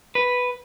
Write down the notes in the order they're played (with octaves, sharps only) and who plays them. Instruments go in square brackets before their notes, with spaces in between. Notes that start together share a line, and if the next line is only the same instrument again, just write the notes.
[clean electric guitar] B4